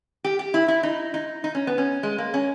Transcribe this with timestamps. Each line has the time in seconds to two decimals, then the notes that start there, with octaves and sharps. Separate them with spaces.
0.24 G4
0.39 G4
0.54 E4
0.68 E4
0.83 D#4
1.14 D#4
1.44 D#4
1.55 C#4
1.67 B3
1.78 C#4
2.03 G#3
2.18 A#3
2.34 C#4